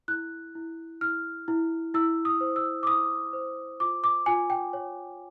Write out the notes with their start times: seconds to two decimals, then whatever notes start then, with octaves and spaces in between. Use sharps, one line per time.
0.08 E4 F#6
0.55 E4
1.01 E4 F6
1.48 E4
1.94 E4 E6
2.25 D#6
2.41 C5
2.56 E6
2.83 D6
2.87 E4 D#6
3.33 C5
3.80 F4 D6
4.04 D6
4.26 F4 G#5
4.50 G5
4.73 C#5